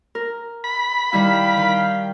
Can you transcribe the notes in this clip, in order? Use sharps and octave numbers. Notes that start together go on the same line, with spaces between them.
A#4
B5
D#3 G3 E4 F5 G5
D#3